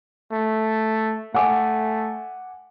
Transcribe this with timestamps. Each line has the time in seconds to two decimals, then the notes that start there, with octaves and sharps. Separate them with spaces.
0.32 A3
1.34 A3 F#5 G#5 D6